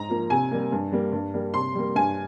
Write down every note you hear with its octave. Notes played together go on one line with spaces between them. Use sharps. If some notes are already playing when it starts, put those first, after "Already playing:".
Already playing: G#2 A#5
F3 A#3
C3 G#5
G3 A#3
G2
G3 A#3
G2
G3 A#3
C3 C6
G3 A#3
G2 G#5